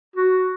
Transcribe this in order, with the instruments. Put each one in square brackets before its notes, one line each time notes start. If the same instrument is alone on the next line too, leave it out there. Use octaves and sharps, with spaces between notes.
[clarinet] F#4